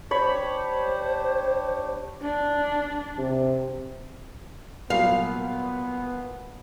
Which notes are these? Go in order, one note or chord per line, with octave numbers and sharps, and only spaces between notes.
D4 G4 C5 C#5 B5
D4
C3
C2 A#2 F#3 B3 F5